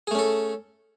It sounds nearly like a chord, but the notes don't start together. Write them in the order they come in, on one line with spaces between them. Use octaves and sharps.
G#4 A3 C#4 A4